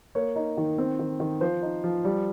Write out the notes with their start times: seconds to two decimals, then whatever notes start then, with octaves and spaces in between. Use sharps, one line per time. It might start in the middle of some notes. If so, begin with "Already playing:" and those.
0.15 A#3 C#5
0.36 D#4
0.57 D#3
0.78 C4
0.99 D#3
1.20 D#3
1.41 F3 C5
1.62 D#4
1.84 F3
2.05 G3